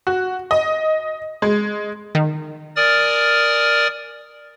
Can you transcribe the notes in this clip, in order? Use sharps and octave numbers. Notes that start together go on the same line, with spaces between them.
F#4
D#5
G#3
D#3
A#4 D5 G#5 D#6 F6 A6